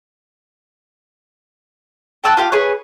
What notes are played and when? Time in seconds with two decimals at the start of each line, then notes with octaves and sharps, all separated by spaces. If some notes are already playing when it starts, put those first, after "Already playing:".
2.24 G5 A5 E6 F#6
2.37 F4 G4 F5 G5
2.52 G#4 B4 C#5